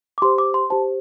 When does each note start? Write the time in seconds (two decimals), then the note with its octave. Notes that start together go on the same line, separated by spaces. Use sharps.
0.18 D6
0.22 G4 C5 C6
0.38 D6
0.54 C6
0.70 G4 C5 A5